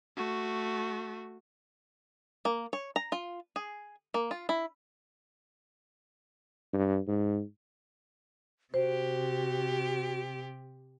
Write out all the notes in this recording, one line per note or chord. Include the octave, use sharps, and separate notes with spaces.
A3 F#4
A#3
C#5
A#5
F4
G#4
A#3
F4
E4
G2
G#2
C3 F#4 G4 C5